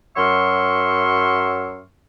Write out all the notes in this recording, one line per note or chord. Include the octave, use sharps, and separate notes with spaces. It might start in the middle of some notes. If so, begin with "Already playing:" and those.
F#2 F#3 E5 C6 C#6 F6